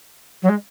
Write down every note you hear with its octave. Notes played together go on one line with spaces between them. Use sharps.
F#3
G#3